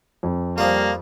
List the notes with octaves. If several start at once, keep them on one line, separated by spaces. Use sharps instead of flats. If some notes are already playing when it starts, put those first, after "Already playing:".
F2
F3 G3 A#3 F4